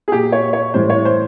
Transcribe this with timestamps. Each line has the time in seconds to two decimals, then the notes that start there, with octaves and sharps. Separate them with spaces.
0.08 G#4
0.12 A#2 F#3 G4
0.32 C#5
0.53 C#5
0.74 A2 E3 G3 C5
0.90 C#5
1.05 C5